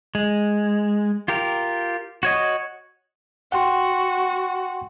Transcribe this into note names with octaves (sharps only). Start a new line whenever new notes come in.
G#3
F4 G4 A#4
F#4 C#5 D#5
F#4 F#5 G5 C6